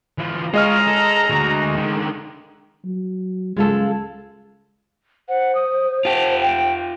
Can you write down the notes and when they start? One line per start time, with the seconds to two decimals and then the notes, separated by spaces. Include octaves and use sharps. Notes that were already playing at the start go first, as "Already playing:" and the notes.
0.18 E3 F4
0.54 G#3 F4 C#5 D#5 A#5 F6
0.87 A4
1.30 D2 F#4
1.76 D3 D#3
2.85 F#3
3.56 C#2 G#3 F4 A4
5.29 C5 F#5
5.55 D#6
6.05 F4 G4 A5
6.42 G5